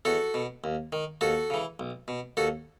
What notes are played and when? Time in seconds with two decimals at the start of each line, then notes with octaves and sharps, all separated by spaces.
0.05 E2 F#4 A4
0.34 B2
0.64 D#2
0.92 D#3
1.21 D#2 F#4 A4
1.50 C#3 E3
1.80 B1
2.08 B2
2.37 D#2 F#4 A4